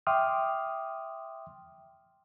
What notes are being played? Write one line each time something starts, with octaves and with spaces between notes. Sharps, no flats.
E5 G5 C6 D6 D#6 F6